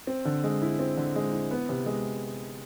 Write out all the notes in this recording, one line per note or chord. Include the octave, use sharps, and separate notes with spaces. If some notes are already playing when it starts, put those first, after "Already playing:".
C4
D3
G#3
E4
C4
D3
G#3
E4
B3
C3
G#3